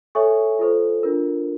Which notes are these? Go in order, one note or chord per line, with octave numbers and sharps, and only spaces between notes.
A4 C#5 E5 G#5 C#6
F4 A4 C5
D4 F4 A#4